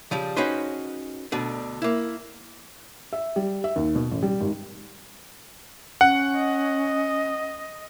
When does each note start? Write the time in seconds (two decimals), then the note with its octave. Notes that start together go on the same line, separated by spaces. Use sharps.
0.11 C#3 F3 G3
0.37 C#4 D#4 F#4 G#4 B4 C5
1.32 D2 B2 D3
1.82 A#3 E4
3.13 E5
3.36 G3
3.64 E5
3.76 D#2
3.95 B2
4.11 A1
4.23 G3
4.41 G#1
6.01 C#4 F#5
6.36 D#5